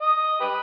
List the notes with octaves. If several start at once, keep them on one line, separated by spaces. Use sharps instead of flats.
D#5
G4 B4